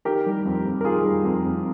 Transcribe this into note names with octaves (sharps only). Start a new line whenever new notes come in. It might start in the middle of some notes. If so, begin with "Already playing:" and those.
D#3 G4 A#4
G3
F2
F2
A#4
D#3 F4 G#4
G3
F2
F2